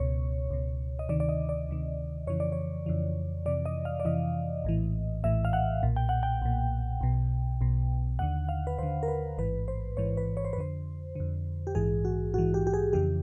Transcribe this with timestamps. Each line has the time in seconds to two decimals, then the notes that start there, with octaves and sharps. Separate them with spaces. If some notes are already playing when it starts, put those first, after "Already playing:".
Already playing: C#2 B2 C#5
0.50 C#2 B2
0.99 D#5
1.09 D2 C3 D#3 D5
1.20 D5
1.29 D#5
1.49 D5
1.69 D2 C3 D#3
2.27 F2 C#3 E3 C#5
2.40 D5
2.52 C#5
2.86 F2 C#3 E3
3.46 F2 C3 E3 D5
3.65 D#5
3.85 F5
4.00 D5
4.05 F2 C3 E3 D#5
4.64 A#1 A2 E3
5.23 A#1 A2 E3 E5
5.45 F5
5.53 F#5
5.83 B1 A#2
5.96 G5
6.09 F#5
6.23 G5
6.42 B1 A#2
7.01 B1 B2
7.61 B1 B2
8.19 D#2 D3 F#5
8.49 F5
8.67 B4
8.79 D#2 D3 C5
9.03 A#4
9.08 B4
9.38 A1 G#2 E3 B4
9.68 C5
9.97 A1 G#2 E3 C#5
10.17 B4
10.37 C#5
10.45 C5
10.53 B4
10.56 F2 D3 C5
11.15 F2 D3
11.67 G4
11.75 A#1 G#2 E3 G#4
12.05 F#4
12.34 A#1 G#2 E3 F#4
12.54 G4
12.67 G4
12.73 G#4
12.93 F2 C#3 E3 G4